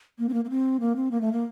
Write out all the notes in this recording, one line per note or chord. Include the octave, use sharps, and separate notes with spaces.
A#3
C4
A#3
A#3
C4
A#3
C4
A#3
A3
A#3